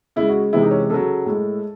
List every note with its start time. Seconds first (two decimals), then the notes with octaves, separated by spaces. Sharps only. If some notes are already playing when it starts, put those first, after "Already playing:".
0.16 C#3 G#3 E4
0.29 F#4
0.53 C3 E3 G#3 E4
0.62 D#4
0.71 C#4
0.90 C#3 F#3 A4
1.26 A2 G#3